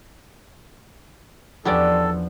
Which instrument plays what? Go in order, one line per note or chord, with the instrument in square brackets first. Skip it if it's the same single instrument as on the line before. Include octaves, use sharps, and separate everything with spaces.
[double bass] E2 F3 [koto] B3 C#4 D4 [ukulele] G4 D5 [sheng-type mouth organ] A4